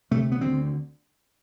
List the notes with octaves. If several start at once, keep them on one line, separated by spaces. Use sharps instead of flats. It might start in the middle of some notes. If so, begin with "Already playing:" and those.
D2 C3 A3
B3
D2 D3 C4